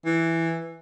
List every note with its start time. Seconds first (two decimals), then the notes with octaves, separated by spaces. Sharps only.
0.05 E3